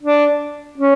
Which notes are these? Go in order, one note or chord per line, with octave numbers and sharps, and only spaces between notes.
D4
C#4